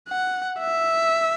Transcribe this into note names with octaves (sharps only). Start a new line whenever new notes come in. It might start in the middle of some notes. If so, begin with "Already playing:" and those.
F#5
E5